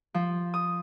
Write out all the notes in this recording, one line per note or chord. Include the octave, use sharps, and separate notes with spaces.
F3
D#6